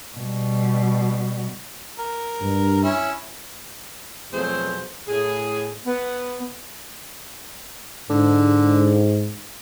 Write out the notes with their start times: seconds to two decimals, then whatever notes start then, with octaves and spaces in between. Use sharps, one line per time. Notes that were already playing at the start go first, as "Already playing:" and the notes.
0.17 B2 G3
1.99 A#4
2.42 G2
2.83 C#4 E4
4.32 F2 B2 F#3 A3 G#4 C5
5.08 A2 G#4
5.86 B3
8.10 G#2 D3